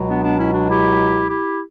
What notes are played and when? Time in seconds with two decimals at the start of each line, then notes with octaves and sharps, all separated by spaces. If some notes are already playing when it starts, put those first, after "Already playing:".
Already playing: C#2 B2 F#3
0.09 B3 D4
0.24 B3 D4
0.38 C#4 E4
0.53 D4 F#4
0.69 E4 G4
1.29 E4 G4